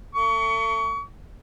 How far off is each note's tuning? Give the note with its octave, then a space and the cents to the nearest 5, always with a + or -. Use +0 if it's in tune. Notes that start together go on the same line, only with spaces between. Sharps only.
A3 +35 C#6 +30